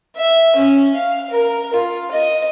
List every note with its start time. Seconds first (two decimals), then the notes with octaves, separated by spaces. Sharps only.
0.16 E5
0.56 C#4
0.95 F5
1.31 A#4
1.74 F4
2.12 D#5